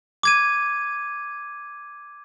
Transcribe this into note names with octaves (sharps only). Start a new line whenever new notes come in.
D6 G#6 D#7